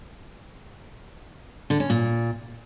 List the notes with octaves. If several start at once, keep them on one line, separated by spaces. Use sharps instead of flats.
D3
C#4
A#2